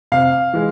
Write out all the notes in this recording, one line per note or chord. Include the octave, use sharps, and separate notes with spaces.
C3 F5
E3 G#3